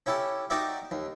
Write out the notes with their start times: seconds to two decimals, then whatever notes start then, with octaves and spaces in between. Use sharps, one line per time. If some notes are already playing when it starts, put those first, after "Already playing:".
0.06 C#4 E4 G4 A4
0.50 D#4 F#4 G4 A#4 D5 E5
0.91 D#2